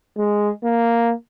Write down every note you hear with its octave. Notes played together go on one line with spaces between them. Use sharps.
G#3
A#3